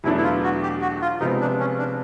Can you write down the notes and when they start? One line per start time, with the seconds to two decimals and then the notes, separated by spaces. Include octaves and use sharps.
0.04 E2 B2 F#3 A3 D4 E4
0.17 E4
0.23 F4
0.44 F#4
0.63 G4
0.82 F#4
1.02 F4
1.20 C3 F3 G#3 B3 D#4
1.41 D4
1.60 C#4
1.78 D4